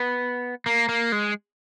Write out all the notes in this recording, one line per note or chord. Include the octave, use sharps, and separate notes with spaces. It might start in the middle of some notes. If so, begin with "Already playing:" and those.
Already playing: B3
A#3
A#3
G#3